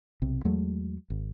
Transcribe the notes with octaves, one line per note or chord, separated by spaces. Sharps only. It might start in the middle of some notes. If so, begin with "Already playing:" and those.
B1 C3
E2 F#3 G#3 A3
G#1